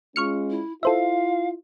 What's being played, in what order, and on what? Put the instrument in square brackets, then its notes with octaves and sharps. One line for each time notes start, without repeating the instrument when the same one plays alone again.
[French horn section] G#3 C#4 F4 [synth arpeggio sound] C#6 F6 C#7
[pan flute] E4
[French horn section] E4 F4 [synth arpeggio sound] A4 C5 E5 [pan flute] F5